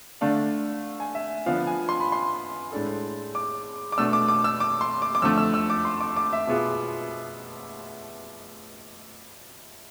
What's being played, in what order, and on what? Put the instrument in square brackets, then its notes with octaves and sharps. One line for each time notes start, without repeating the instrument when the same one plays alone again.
[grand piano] D3 A3 D4 [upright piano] F5
[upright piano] G#5
E5
[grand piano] D3 F3 B3 D4 [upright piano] F5
[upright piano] G#5
C6
B5
C6
[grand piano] A2 G#3 D4 A4
[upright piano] D6
D6
[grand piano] B2 A3 D4 [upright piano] E6
[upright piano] D6
D6
E6
D6
C6
D6
D6
[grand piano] F2 D3 A3 [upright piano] E6
[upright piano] E6
E6
D6
C6
D6
D6
E5
[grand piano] B2 B3 F4 G#4